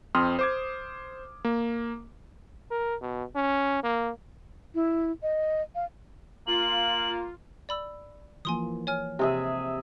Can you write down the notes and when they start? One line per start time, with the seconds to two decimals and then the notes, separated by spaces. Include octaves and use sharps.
0.15 F2 C4 C6 D#6 F6
0.39 C5 D6 G#6
1.45 A#3
2.71 A#4
3.01 B2
3.36 C#4
3.84 A#3
4.75 E4
5.23 D#5
5.75 F5
6.47 A#3 F4 F#7
7.69 D5 B5 E6
8.45 E3 F3 A#3 G#5 C6 D#6
8.87 C#5 G#5 F6
9.19 C3 G4 G#4 E5